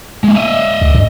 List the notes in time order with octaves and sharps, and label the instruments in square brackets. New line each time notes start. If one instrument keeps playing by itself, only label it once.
[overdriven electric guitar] G#3 A#3
D#5 E5
[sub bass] D2
G2